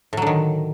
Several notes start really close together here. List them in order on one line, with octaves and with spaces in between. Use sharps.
A2 F#3 D3 D#3